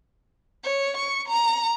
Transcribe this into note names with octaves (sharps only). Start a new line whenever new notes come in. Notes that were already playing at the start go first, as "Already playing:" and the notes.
C#5
C#6
A#5